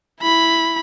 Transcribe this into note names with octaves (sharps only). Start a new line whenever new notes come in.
E4 B5